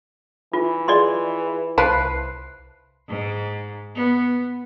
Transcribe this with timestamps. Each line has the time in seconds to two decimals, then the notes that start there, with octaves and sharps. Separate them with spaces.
0.53 E3 F4
0.88 F4 G#4 D5 D#5 C6
1.78 C2 E4 F4 B4 C5 A5 C7
3.09 G#2
3.95 B3